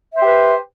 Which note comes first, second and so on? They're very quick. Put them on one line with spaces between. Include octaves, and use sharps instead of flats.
E5 C5 G4 B4